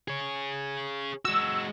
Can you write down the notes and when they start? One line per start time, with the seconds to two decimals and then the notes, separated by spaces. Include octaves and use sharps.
0.08 G#4 C#5
1.25 G#3 F#4 E6